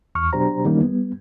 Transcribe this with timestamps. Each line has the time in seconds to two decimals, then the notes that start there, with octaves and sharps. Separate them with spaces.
0.15 E2 C#6 F6
0.33 B2 F#3 D4 G4 C5 A#5
0.65 D#3 E3 G3 A#3 C#4 D#4
0.83 G3 B3